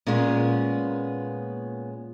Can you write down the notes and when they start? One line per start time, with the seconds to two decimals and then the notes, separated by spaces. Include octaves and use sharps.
0.07 A#2 G#3 B3 C#4